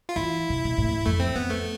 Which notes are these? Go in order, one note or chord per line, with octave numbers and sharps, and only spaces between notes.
F4
E3 E4
C3
B2
A2
G#2
F2 A3
C4
G#2
F2 B3
A3